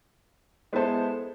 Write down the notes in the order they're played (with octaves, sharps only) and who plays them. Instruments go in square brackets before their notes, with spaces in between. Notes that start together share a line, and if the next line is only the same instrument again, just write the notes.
[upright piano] G#3 B3 E4 A4 C5